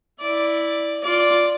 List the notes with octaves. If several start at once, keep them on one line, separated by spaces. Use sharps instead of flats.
E4 D5
F4 D5